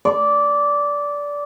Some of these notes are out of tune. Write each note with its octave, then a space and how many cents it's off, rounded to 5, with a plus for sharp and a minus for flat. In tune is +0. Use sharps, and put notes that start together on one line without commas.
D5 -15